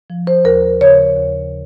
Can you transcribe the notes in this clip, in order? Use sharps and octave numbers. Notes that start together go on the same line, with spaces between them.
F3
C5
D#2 A#4
C#3 C#5
D#2